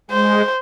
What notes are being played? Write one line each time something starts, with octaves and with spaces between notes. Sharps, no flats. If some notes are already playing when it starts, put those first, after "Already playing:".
G#3 C5